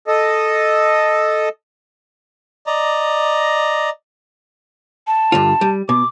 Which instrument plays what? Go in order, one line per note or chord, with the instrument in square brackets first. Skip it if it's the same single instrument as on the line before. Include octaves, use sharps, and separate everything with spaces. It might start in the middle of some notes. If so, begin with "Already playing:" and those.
[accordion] A4 D#5
[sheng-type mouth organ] D5 D#5 A#5
[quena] A5
[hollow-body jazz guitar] G2 D3 F4
G3
[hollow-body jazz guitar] B2 [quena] D6